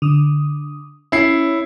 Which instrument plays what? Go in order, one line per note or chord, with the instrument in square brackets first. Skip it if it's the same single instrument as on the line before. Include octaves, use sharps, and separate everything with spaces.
[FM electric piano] D3 D#6
[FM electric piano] C#4 [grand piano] E4 C7